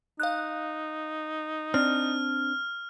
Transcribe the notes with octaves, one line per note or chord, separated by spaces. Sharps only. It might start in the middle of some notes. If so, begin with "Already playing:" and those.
D#4 F5 F#6
C4 D4 F6